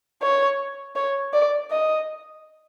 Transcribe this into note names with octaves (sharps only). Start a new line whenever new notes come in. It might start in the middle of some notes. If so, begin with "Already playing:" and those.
C#5
C#5
D5
D#5